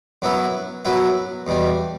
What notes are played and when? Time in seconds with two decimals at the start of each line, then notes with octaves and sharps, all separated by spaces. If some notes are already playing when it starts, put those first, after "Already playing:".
0.22 F#2 F#3 B3 E4
0.85 F#2 F#3 B3 E4
1.47 E2 B2 G3